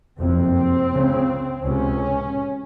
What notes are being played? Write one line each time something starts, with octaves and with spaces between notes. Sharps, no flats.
F#1 F2 C3 C4
C#2 C#3
C#2 C3 C#4